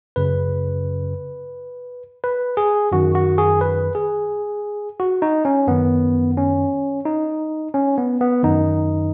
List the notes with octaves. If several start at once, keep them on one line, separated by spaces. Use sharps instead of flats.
F#2 C#3 B4
B4
G#4
F#2 D#3 F#4
F#4
G#4
B4
G#4
F#4
D#4
C#4
F#2 D#3 B3
C#4
D#4
C#4
B3
B3
F#2 D#3 D#4